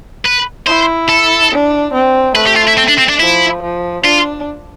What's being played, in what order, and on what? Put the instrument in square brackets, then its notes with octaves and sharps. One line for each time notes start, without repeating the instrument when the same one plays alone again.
[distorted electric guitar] B4
[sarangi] E4 [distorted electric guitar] C5
[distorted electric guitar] A4
[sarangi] D4
C4
[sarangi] A3 [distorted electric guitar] B4
[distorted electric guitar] G4
F4
E4
C4
D4
C4
D4
[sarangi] F3 [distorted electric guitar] E4
[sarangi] F3
[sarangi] D4 [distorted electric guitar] F4